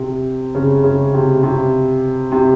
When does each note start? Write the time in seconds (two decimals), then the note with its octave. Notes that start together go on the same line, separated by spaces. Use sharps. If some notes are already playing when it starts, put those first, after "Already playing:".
Already playing: C3
0.55 C#3
0.84 C#3
1.14 C3
1.43 C3
2.32 C3